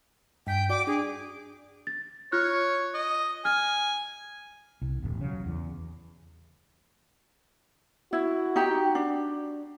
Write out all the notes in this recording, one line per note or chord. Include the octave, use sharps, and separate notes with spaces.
G2 G5 B6
F#4 D5 G5 D6
D4 G#4
A6
F4 C#5 F6 F#6
D#5
G#5 F6
C2
E1 A1
C#3 F#3
E2
E4 F#4
D#4 G4
D4